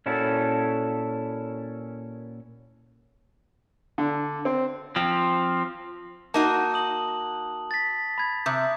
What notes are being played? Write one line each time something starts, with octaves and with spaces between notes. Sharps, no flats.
A#2 C#4 E4 F#4 A4
D3
C4
F3 C4
A#3 D#4 F#4 A5
D#6 F#7
A6 B6
B5 G#6
C3 D6 D#6 G6